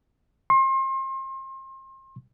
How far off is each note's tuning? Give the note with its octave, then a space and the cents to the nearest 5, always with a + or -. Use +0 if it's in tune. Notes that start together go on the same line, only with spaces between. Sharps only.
C6 +35